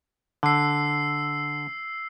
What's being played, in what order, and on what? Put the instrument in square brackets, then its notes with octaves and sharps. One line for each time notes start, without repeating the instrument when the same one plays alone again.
[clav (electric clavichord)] D3 [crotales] E6 C7